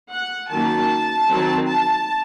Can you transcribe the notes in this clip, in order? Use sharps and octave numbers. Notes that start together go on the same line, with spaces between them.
F#5
D#3 F#3 A#3 C#4 A5
D#3 F#3 C4
A5